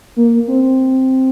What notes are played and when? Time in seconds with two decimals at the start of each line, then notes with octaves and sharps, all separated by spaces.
0.16 A#3
0.48 C4